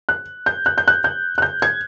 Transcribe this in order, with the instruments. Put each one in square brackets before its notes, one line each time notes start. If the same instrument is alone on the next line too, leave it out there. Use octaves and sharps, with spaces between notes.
[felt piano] F#6
G6
F#6
G6
F#6
G6
F#6
G6
G#6